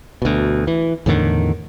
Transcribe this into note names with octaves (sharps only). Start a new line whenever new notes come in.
D2 B2
E3
E2 A2 D3 D#3